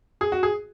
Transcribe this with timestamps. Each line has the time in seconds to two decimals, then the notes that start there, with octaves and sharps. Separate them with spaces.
0.21 G#4
0.32 F#4
0.43 G#4